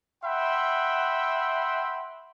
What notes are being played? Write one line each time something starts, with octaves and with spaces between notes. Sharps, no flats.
E5 F#5 G5 B5 C6